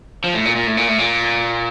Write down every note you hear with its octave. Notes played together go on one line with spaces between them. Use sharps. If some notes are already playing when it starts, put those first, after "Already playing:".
F3
A2
A#2
A#2
A2
A#2
A2
A#2